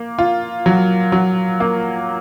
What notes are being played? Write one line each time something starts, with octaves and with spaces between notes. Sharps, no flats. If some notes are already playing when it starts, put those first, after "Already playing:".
Already playing: A#3
F4
F#3
F#3
A#3